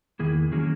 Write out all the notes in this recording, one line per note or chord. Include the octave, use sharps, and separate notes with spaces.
E2 D#3 A#3 E4 G#4
D#3 F#3 A#3 C#4 G#4